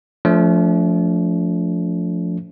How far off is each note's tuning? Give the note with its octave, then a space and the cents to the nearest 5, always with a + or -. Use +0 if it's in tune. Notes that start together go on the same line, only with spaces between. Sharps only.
F3 +5 A3 +0 D4 -40